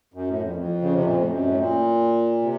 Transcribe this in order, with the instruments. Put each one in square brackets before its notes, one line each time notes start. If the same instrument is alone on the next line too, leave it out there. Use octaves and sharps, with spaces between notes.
[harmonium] F#2
A2
F2
F2
C#3
C3
A#2
A2
F#2
A2
A#2
C3